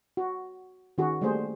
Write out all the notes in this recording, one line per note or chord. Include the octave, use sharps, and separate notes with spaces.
F#4
D#3 C#4 F#4 G#4
G3 A3 A#3 G#4 C5